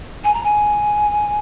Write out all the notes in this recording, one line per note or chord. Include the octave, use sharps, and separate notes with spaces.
G#5
A#5
G#5